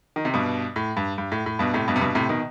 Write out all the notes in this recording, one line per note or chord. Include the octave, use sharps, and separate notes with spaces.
D#3
C3
G2 B2
A2
G2
G2
A2
A2
G2 B2
A2 C3
G2 B2
C3
G2 B2
A2 C3
B2 D#3